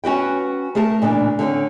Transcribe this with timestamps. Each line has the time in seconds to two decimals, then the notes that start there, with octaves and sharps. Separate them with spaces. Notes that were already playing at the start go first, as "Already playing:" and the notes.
0.04 C#4 F#4 B4 G5
0.75 A3 G#4 A#4 A5
1.02 A#2 C#3 E3 D4
1.39 D3 C4 C#4